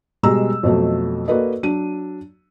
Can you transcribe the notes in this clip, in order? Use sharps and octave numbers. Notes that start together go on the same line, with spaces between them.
B2 G3 G#3 A#5 E6
F2 B2 F#3 A3
A#3 F#4 A4 B4 D5 D#5
F#3 D4 D#7